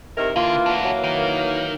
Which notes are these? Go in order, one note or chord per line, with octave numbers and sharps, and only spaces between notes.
C3 D#3 E4 A#4
D3 E3 A#3 F4
D4 F#4
F#3
D#3